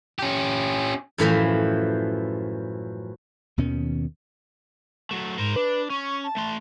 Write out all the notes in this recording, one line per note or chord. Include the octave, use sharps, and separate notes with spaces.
C#4 G4
F#2 A2 E3 F3
D#2 B2 D#3 C#4
F#3 A3
G#2 A#4 C5
D4 B4
C#4 C#6
A5
A3 C6